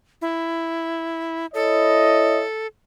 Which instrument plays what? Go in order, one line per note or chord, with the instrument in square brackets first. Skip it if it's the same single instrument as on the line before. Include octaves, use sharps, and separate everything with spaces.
[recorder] E4
[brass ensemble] E4 C#5 D#5 [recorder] A4